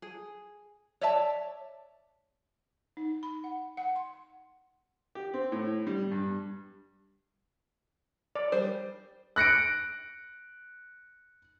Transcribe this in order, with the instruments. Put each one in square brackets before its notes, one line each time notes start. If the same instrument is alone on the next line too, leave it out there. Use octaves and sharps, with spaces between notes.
[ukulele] G#4
C#5 D5 E5 A5
[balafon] D#4
B5
F#5
F#5
C6
[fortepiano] G4
C4
A2
G3
G2
[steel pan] D5
[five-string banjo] G3 C5
[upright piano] F#6 A#6 C#7 D7